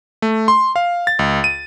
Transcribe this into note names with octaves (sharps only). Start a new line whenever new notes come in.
A3
C6
F5
A6
C#2
D#7